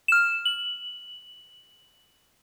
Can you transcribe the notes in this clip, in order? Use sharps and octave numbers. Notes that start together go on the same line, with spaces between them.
F6 E7
F#7